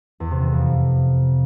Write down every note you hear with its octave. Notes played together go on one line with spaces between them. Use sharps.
E2
C3
E3
F2